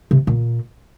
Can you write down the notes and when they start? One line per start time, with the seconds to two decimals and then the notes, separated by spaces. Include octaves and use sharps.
0.11 C3
0.27 A#2